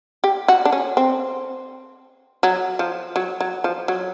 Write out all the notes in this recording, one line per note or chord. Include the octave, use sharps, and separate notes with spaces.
G4
F#4
D4
C#4
C4
F#3
F3
F#3
F#3
F3
F#3